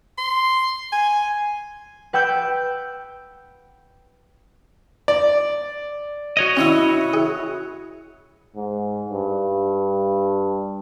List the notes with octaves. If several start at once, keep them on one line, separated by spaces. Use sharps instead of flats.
C6
G#5
B4 F#5 G5 E6 G6
D5
F#4 C#5 D#5
C#4 D#4 E4 E5
G#4
G#2
G2